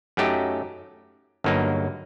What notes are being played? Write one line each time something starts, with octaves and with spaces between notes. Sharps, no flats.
F#2 F#3 A3 D#4 G4
G1 G2 F#3 A#3 D#4